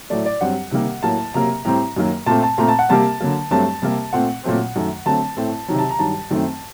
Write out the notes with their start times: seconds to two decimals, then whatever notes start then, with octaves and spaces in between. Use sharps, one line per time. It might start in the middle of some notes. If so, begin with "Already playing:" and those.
0.10 A2 F#3 A3 D5
0.25 D5
0.41 G2 F#3 C4 F#5
0.71 C3 D#3 G3 A#3
1.03 A2 F#3 A#3 A5
1.34 C3 F#3 A#3 A#5
1.65 A2 G3 C4 A#5
1.96 F#2 D#3 F#3 A#3
2.26 A#2 A3 C4 A5
2.43 A5
2.58 A#2 A3 C4 A#5
2.68 A5
2.79 F#5
2.89 C3 G3 A#3 A5
3.21 D3 F#3 A#3
3.51 G2 F#3 A3 C4 A5
3.82 C3 G3 A#3
4.13 A#2 A3 C4 F#5
4.44 A#2 F#3 A3 C4
4.76 F#2 D#3 A3
5.06 D3 F#3 A3 C4 A5
5.37 A2 A3 C4
5.68 C3 D#3 F#3 A#5
5.79 A5
5.89 A#5
5.99 G2 D#3 F#3 A5
6.31 F#2 D#3 A3 C4